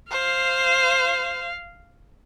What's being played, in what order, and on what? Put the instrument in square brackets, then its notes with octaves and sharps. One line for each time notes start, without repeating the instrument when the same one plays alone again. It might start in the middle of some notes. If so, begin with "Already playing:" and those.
[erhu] C5 [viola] F5